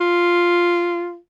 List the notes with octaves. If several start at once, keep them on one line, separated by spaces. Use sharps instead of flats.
F4